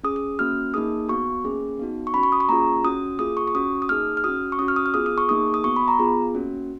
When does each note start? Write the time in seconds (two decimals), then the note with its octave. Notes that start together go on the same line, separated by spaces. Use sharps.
0.03 C#4 G#4 D#6
0.16 D#6
0.39 A#3 C#4 F#4 F6
0.74 A#3 D#4 G#4 D#6
1.09 B3 F#4 C#6
1.44 A#3 C#4 G#4
1.79 B3 D#4 F#4
2.07 C#6
2.14 C#4 F#4 B5
2.23 C#6
2.32 D#6
2.40 C#6
2.49 A#3 C#4 F4 G#4 A#5
2.84 C#4 F#4 D#6
3.19 A#3 F4 G#4 D#6
3.37 C#6
3.48 C#6
3.55 C#4 F#4 D#6
3.82 D#6
3.89 A#3 D#4 G#4 F6
4.17 F6
4.24 C#4 F#4 D#6
4.52 C#6
4.59 C#4 F#4 D#6
4.68 F6
4.76 D#6
4.86 F6
4.94 B3 F4 G#4 D#6
5.06 D#6
5.18 C#6
5.29 A#3 D#4 G#4 D#6
5.54 D#6
5.64 B3 F#4 C#6
5.76 B5
5.88 A#5
5.99 B3 F4 G#4
6.34 A#3 C#4 F#4